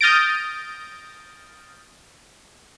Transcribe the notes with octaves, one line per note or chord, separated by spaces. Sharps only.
D#6 F6 G6 A6 A#6 D7